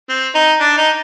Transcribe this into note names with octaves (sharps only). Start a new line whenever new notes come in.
C4
D#4
D4
D#4